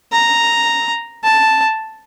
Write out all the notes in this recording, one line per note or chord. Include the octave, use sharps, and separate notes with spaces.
A#5
A5